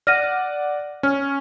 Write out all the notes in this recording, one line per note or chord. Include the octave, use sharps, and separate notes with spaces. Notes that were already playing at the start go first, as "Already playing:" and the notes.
D5 F#5 F6 A#6 D#7
C#4 F6